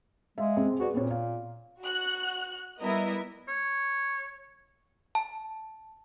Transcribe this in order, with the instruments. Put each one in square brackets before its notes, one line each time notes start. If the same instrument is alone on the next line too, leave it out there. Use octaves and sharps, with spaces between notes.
[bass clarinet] G#3 [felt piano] E5 F5
[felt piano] C3 G#4
[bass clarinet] F#4 [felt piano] G#4 B4 D5
[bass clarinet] A#2 [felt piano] B3 C4 C#5
[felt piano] F5
[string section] F#4 F#6
G3 B3 E4 A#4 D#5 E5
[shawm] C#5
[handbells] A5